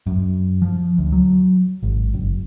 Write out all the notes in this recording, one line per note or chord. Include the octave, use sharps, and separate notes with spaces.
F#2
F3
D2
F#3
G#1
F#1